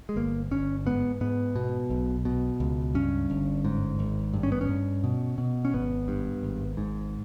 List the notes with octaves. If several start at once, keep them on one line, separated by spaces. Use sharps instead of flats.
G#3
G1 A#3
G1 C#4
G#2 B3
G#2 B3
B2
B1
B2
C#2
G2 C#4
G1
G#2
G#1
G2
C#4
B3
C#4
G2
B2
B2
C#4
G#1 B3
G2
G#1
G#2